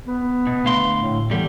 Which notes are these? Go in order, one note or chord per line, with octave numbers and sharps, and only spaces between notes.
B3
B2
D2 F5 C6
A2
E2 D3 G3